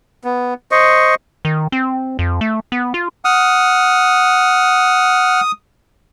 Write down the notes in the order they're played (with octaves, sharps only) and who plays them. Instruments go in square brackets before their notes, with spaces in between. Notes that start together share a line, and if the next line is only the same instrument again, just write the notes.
[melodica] B3
C5 D#5 C#6
[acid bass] D#3
C4
F2
A3
B3
F4
[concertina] F#5 F6 [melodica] D#6